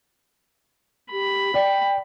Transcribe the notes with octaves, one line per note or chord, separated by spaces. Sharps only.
G4 B5
D5 G5